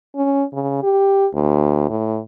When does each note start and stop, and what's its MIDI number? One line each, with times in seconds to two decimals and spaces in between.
0.15 0.43 61
0.53 0.78 49
0.83 1.26 67
1.34 1.85 38
1.89 2.19 45